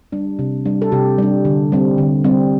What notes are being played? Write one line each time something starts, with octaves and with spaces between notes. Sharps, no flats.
G3 D4
C3
G3 D4
A4
C3 G4
G3 D4
D3
G3 C4
D3
G3 C4